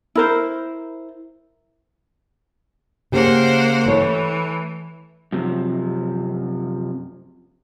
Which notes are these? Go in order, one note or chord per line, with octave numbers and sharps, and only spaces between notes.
E4 A#4 C5
C#3 A#3 G4 C5 F#5
E3 A3 C#5
F#2 C3 F3